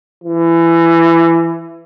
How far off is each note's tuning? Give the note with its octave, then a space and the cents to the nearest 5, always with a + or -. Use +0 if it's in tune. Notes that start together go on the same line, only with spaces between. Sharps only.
E3 +20